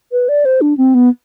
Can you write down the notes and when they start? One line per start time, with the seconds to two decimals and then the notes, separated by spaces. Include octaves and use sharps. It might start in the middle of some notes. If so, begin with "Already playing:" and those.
0.12 B4
0.29 D5
0.45 C5
0.61 D4
0.77 C4
0.94 B3